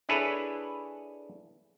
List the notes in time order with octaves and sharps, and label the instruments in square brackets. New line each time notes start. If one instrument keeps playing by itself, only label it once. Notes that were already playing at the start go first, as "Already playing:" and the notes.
[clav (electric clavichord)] D4 E4 G#4 A4 B4 C#5